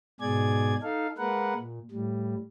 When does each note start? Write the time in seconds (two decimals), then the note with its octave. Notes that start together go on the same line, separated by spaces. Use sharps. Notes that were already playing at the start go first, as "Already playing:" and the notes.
0.20 G#2 B2 G#4 D5 G#6
0.83 D#4 A4 F5
1.18 G#3 A#3 A#4 B4 F#5
1.55 A#2
1.91 A2 G3